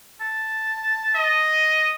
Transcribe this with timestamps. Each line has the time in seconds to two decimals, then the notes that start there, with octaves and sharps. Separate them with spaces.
0.21 A5
1.15 D#5